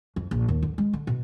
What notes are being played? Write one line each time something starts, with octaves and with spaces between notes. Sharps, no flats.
F2
A#1
D#2
D3
G#3
D3
B2